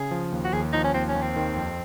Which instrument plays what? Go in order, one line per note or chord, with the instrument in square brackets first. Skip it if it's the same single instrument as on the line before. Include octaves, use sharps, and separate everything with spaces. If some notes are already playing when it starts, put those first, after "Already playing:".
Already playing: [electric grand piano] C#3 [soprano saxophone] G#4
[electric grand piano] F3
D#2
[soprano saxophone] F#4
[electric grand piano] D#2 [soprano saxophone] G#4
[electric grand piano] F3 [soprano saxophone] D#4
[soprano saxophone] C#4
[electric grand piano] D#2 [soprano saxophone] C4
[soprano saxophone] C#4
[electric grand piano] D#2
[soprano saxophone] C4
[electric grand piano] D#3
F2